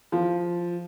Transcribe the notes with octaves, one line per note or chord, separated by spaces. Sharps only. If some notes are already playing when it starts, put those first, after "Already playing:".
F3